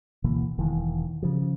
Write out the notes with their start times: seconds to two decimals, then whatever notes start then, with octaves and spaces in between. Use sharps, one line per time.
0.24 D2 B2 E3 A#3
0.58 E1 D#3 E3
1.23 C#3 F3